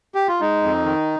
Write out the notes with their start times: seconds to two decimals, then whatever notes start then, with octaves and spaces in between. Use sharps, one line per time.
0.15 G4
0.28 F4
0.40 G#3 D#4
0.63 F2
0.85 D#3